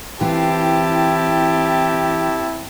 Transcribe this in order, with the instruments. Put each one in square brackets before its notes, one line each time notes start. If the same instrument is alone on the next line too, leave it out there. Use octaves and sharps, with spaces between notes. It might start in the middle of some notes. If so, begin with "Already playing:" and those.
[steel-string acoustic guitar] E3 F4 [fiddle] C4 A5 [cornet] E4 [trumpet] G4